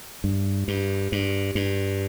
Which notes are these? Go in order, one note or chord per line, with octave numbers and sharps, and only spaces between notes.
G2
G2
G2
G2